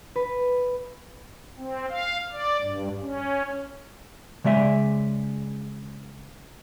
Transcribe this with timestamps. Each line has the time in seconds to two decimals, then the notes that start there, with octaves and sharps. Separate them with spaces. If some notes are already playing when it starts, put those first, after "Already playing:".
0.16 B4
1.58 C4
1.90 F5
2.32 D5
2.62 G2
3.02 C#4
4.44 C#3 G#3 D5 E5 G#5